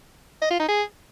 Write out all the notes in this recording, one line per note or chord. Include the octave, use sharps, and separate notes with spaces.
D#5
F4
D#4
G#4